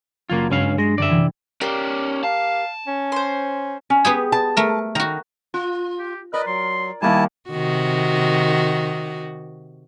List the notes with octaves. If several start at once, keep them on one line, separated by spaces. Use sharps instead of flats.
F#1 F#3 A#3 F4 G#6
C#2 G2 C#4 F5
G#3 A#6 C7
F#2 D3 G3 D5 E5
C3 E3
A#3 C#4 G4 D5
F5 A5
C#4
C5 C6
C#4
B3 G4 G#4
A5
A3 A#4
D#3 F#4 A#5
F4
G4
A#4 B4 D5 D#5 B5
F#3 C6
D#2 G3 E4 G#5 A5
C3 D#3 F#4